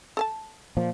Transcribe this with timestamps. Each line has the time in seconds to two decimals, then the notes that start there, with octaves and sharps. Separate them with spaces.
0.17 A4 G#5 A5
0.77 A#2 F3